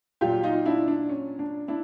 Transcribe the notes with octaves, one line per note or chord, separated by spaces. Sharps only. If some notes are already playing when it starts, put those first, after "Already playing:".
A#2 F#3 F4 G4
D#4 F4
D4 E4
D4
C#4
D4
D4 E4